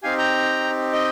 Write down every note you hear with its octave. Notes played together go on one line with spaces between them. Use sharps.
C4 D#4 G4 F5 G#5
G5 A#5
D#5 G5